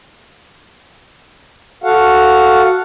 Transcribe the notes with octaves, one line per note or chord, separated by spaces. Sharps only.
F#4 A4 F5 F#5